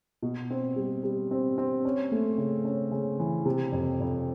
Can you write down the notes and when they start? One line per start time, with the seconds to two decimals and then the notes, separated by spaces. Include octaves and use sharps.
0.22 B2
0.50 C4
0.76 G3
1.03 G3
1.31 C4
1.58 C4
1.85 C#4
2.12 A3
2.38 C#3
2.65 C#4
2.91 C#3
3.20 E3
3.45 C3
3.72 F2
4.00 F2